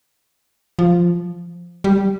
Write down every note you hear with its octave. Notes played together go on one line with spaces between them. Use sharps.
F3
G3